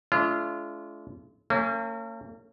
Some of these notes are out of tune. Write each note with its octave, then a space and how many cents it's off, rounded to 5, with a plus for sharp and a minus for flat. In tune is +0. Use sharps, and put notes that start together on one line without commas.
A3 -45 D4 -40 F4 -30
A#3 -45 C#4 +0